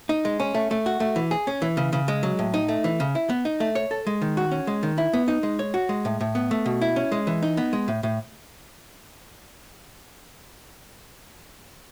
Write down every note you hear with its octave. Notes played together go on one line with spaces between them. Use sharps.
D#4
G#3
C#4
A3
A3
F#4
A3
E3
G#4
C#4
E3
C#3
C#3
G#3
F#3
A2
D#4
A3
E3
C#3
E4
B3
D#4
A3
C#5
A4
G#3
D#3
F#4
C#4
G#3
D#3
E4
B3
D#4
G#3
C#5
F#4
G#3
A2
A2
B3
A3
B2
E4
C#4
G#3
E3
D#4
B3
G#3
A2
A2